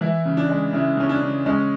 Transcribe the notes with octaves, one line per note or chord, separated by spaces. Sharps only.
E3 E4
C#3
D4
G#3
C#3 E4
C#3 C#4
D4
C#3
G#3 C#4